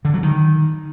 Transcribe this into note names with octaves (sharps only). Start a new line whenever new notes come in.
D3
F#3
D#3